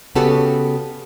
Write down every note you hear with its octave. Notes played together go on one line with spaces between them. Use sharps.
C#3 B3 C#4 F#4 G4 A4